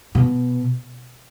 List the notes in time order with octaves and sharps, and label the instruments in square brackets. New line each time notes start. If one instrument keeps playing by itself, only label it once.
[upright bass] B2